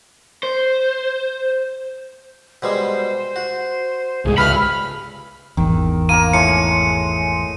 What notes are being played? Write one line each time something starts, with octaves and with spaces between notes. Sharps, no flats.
C5
B2 G3 G#3 C5
F#4
C2 G#2 G#3 G#4
C#2 G2 A3 B4 B5 F6
G#1 E2 D#3
A#3 A#4 A#5 D#7
A2 G#3 C#6 C#7